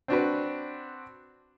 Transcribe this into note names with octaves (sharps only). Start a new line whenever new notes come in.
C4 D4 F#4 B4